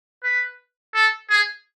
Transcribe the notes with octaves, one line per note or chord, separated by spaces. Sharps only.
B4
A4
G#4